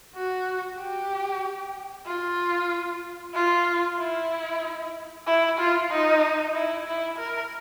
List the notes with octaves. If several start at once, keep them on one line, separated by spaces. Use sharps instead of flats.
F#4
G4
F4
F4
E4
E4
F4
D#4
E4
E4
A#4